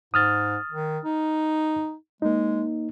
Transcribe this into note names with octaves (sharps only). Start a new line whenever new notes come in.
G#2 D#6 F6 A6
D#3
D#4
G#3 A#3 D#4